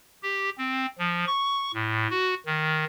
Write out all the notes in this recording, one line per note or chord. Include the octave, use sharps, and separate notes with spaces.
G4
C4
F3
C#6
A2
F#4
D#3